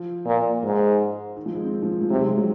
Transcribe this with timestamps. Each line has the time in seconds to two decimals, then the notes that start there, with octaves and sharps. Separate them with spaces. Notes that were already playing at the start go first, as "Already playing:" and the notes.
Already playing: F3
0.26 A#2
0.63 G#2
1.37 D#3
1.46 F3
1.55 G#3
1.64 C4
1.73 D#3
1.83 F3
1.91 D#3
2.01 F3
2.10 C3 F#3
2.19 G#3
2.28 F3
2.37 F#3